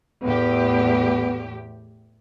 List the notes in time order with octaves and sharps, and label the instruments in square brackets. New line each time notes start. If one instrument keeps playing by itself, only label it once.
[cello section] E2 A2 G4 [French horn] B3